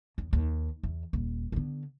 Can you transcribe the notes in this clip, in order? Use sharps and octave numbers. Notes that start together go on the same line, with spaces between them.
E2
D#2
E2
D#1
D3 B3